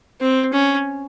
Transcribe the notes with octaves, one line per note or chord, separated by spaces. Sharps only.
C4
C#4